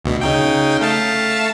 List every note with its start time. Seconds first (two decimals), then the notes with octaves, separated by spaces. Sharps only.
0.05 D2 B2
0.21 C#3 D#4 G5
0.81 A3 F5 A5